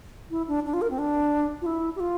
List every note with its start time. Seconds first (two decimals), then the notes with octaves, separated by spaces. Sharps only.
0.31 E4
0.48 D4
0.65 D4
0.73 F4
0.81 A#4
0.90 C4
0.98 D4
1.62 F4
1.66 E4
1.96 G4
2.00 F4